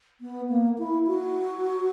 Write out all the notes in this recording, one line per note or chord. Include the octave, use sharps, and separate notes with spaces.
B3
A#3
E4
F#4